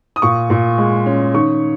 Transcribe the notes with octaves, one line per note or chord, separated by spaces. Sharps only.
D#6
A#2 C#6
A#2
G#3
C#4
D#3 C#6